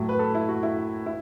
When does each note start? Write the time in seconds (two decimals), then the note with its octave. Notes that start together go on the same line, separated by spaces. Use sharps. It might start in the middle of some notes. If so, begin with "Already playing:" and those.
Already playing: A2 F#3
0.09 B4
0.19 A4
0.35 E4
0.49 F#4
0.63 E4
1.06 E4